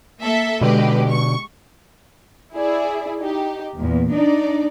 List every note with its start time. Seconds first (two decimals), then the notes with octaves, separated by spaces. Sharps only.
0.20 A#3 A4 E5
0.61 B2 D3 G#3 G4 B4
1.09 C#6
2.54 E4 G#4 D5
3.20 D#4 G4
3.79 E2 A#2
4.11 D4 D#4 D5